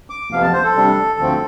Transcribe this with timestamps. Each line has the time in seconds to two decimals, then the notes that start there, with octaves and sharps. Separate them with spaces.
0.10 D6
0.31 F2 C3 F3 B3 F5
0.42 A5
0.53 C5
0.64 A4
0.76 C3 G3 D4
1.19 D2 D3 F3 A3 C4